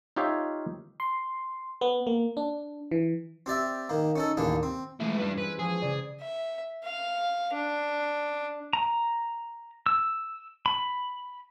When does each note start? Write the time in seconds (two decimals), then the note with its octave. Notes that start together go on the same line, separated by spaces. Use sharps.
0.16 D#4 F4 G4 C#5 E5 F5
1.00 C6
1.81 B3
2.07 A#3
2.37 D4
2.91 E3
3.46 C4 G4 D5 E5
3.89 D#3 A#3
4.16 C#4 D#4 A4
4.37 A1 D#2 A#3 D4 G#4
4.63 C4
5.00 E3 G#3 A3 C#4 E4 F4
5.18 G3 D4 B4
5.38 G#4 B4 C5 E5
5.59 F3 G#3 G4 G#4 C#5
5.82 C#3 D5
6.21 E5
6.84 F5
7.53 D4
8.73 A#5
9.86 E6
10.66 B5